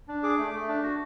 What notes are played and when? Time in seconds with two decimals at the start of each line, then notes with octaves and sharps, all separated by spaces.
0.08 D4
0.23 G#4 D6
0.38 A3
0.54 A3
0.69 D4
0.83 F#4